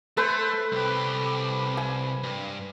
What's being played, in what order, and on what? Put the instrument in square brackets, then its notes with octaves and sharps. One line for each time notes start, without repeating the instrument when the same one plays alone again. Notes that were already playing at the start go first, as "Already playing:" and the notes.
[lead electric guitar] A3 [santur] A4 B4 C5
[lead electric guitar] C2 G4
[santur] G#5
[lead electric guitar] G2